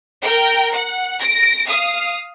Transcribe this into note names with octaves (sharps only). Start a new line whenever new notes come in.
A#4 G5
F#5
A#6 D7
F5 D#6